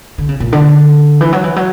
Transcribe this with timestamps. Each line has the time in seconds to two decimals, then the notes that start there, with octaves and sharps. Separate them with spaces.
0.18 D3
0.29 C#3
0.40 A#2
0.53 D3
1.21 E3
1.32 F#3
1.44 E3
1.56 F#3